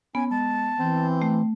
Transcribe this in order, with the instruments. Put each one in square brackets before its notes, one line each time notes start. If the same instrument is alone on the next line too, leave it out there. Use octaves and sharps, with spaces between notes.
[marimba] B3 [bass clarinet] C#4 [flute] G#5
[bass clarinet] G#3 [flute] A5
[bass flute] E3 [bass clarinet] C4
[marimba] A3